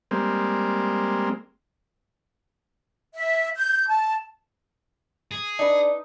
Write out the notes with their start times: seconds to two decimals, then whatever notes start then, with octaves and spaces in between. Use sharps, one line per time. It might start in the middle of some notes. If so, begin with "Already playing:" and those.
0.11 G3 G#3 A#3 C4
3.14 E5
3.56 G6
3.88 A5
5.32 G#4
5.59 D4 D#4 B4